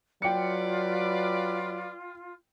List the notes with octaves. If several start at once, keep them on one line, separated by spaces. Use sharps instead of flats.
F#3 F4 B4 D5 G5 C#7